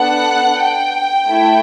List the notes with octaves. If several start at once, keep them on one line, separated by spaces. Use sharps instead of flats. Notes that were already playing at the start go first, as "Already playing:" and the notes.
Already playing: B3 D4 A4 F#5
G5
A3 E4 A4